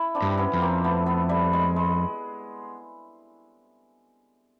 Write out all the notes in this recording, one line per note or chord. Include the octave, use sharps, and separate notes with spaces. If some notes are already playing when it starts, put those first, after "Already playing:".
Already playing: E4
C4 D4
G2
B3 C#4
F2
A#3 C4
A3 B3
A3 B3
G3 A3
G#3
G#3